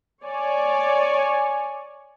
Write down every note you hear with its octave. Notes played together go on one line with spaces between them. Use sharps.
C#5 D5 G#5